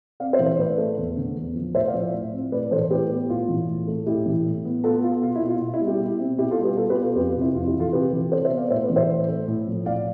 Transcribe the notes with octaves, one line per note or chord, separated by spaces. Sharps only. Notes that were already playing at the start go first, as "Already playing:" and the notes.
C4 D5 F5
C5 E5
E3
C5 E5
A2 B4 D5
A3
E2
D3
E2
F3
A2 C5 E5
D5 F5
F3
A2
C4
A2 B4 D5
E3 A4 C5
A2 G4 B4
B3
A2 F4
E3
A2
A3
A2 E4 G4
E3
A2
B3
B3 F4 A4
B3 F4
B2 F4
E4
B2
F4
B2
E4
G3
E4 G4
B2
C4
B2 E4 G4
F4 A4
G3
G4 B4
B2 F4 A4
G4 B4
B3
F4 A4
F2 G4 B4
F4
C3
E4
F2 F4
E4 G4
E3
F4 A4
C3 G4 B4
E3
C3 A4 C5
C5 E5
B3
D5 F5
A2 C5 E5
B4 D5
E3
C5 E5
A2
A3
A2
F3
A2 D5 F5